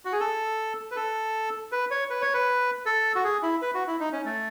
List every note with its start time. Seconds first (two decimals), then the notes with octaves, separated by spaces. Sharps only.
0.05 F#4
0.12 G#4
0.20 A4
0.91 B4
0.96 A4
1.72 B4
1.91 C#5
2.10 B4
2.22 C#5
2.34 B4
2.86 A4
3.15 F#4
3.24 G#4
3.43 E4
3.62 B4
3.75 F#4
3.87 E4
4.00 D#4
4.13 C#4
4.25 A3